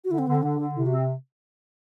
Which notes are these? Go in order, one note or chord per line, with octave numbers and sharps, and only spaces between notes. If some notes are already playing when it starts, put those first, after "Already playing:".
F#4
D3 E4
C4
D3 B3
C4
D3 D4
D3
C3 E4
F#4
C4